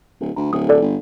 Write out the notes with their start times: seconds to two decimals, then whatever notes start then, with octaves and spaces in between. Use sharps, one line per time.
0.21 D1
0.36 D2 A#5
0.53 D1 D#6
0.69 A4 D5
0.82 G1